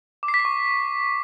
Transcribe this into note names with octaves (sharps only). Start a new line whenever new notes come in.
D6
C7
B6
C7
C#6